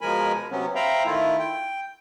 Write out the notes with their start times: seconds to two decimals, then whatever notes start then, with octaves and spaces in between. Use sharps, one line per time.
0.01 B2 F3 G#3 A#4 G#5 B5
0.51 C3 F#3 B3 C#4
0.76 C5 E5 F5 G5 A#5 B5
1.06 D#3 A3 E4 F4
1.39 G5